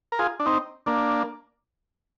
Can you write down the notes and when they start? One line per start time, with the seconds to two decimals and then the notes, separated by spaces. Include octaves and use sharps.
0.12 A#4
0.19 F4 G#4
0.40 D4
0.46 C4 D#4
0.86 A#3 D4